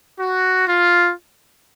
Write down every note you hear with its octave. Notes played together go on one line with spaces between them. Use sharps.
F#4
F4